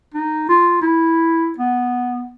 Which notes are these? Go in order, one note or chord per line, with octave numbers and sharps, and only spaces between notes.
D#4
F4
E4
B3